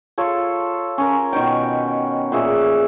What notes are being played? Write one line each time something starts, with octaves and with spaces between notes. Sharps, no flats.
F4 A4 C#5
C#4 A#4
B2 D#3 C#5 G5
A#2 G#4 E5 C#6